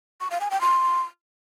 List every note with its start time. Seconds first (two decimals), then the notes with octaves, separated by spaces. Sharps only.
0.21 C#6
0.31 F5
0.41 G#5
0.51 G5
0.61 C6